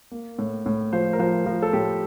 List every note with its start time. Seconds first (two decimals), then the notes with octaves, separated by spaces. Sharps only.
0.11 A#3
0.39 A2
0.66 A2
0.93 F3 C5
1.13 A#4
1.19 F3 C5
1.46 F3 A#4
1.62 A4
1.73 A2 G4